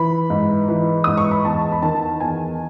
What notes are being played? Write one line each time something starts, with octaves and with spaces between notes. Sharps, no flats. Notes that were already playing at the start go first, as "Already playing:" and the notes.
Already playing: E3 B5
G#2
E3
G#2 D#6
C#6
B5
E2 A5
B5
D#3 A5
E2 G#5